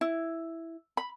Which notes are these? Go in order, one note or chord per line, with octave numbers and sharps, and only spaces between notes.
E4
B5